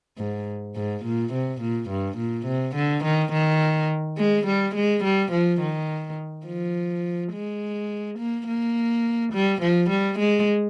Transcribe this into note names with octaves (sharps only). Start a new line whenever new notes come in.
G#2
G#2
A#2
C3
A#2
G2
A#2
C3
D3
D#3
D#3
G#3
G3
G#3
G3
F3
D#3
F3
G#3
A#3
A#3
G3
F3
G3
G#3